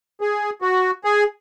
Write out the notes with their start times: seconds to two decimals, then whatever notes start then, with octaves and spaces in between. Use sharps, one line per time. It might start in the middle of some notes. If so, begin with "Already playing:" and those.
0.21 G#4
0.62 F#4
1.04 G#4